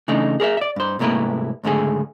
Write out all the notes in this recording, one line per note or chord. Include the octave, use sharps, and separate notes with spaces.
C#3 E3 A3 D4 D#4
G#4 A#4 C#5 E5
D5 E5
G2 C5
C2 G#2 A3 A#3 E4 B4
C#2 G#2 D3 A3 G#4